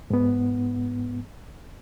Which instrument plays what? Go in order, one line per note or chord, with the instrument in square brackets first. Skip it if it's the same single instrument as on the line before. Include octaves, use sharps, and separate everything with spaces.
[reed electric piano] G#2 B3